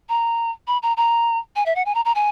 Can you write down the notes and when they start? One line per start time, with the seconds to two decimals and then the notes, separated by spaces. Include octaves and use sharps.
0.09 A#5
0.68 B5
0.83 A#5
0.97 A#5
1.56 G#5
1.66 E5
1.76 F#5
1.86 G#5
1.95 A#5
2.05 A#5
2.15 G#5